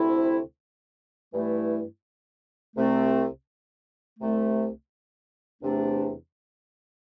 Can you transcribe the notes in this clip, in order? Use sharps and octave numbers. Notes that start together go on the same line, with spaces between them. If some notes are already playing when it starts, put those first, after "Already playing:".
Already playing: D2 C3 A3 C4 E4
G2 E3 A3 E4
C2 C3 A3 C4
C2 C3 A3
E2 C3 A3 D4